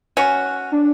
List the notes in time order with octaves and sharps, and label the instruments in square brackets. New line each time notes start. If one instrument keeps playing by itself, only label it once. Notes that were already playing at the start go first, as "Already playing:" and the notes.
[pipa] C#4 F#4
[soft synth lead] D4